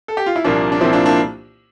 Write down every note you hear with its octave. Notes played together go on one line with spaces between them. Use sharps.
A4
G4
F4
E4
C2 A#2 F3 A#3 D4
D4
C2 A#2 F3 C4 E4
D4 F4
A#3 D4